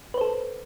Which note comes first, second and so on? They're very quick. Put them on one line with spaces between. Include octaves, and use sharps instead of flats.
B4 C5 A4